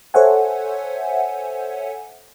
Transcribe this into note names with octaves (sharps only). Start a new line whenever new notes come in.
A4 C5 C#5 E5 F#5 G#5